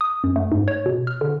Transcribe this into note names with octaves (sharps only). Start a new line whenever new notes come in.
D#6
F#2
A3
G#2
C#5
B2
F6
D3